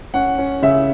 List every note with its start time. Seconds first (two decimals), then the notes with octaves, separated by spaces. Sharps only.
0.14 C#4 F#5
0.38 C#4
0.62 C#3 E5